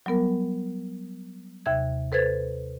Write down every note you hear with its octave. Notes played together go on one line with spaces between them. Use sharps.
F#3 G3 B3 A#4
D#2 C3 E5 G#6
A4 B4 C5 G#6 A6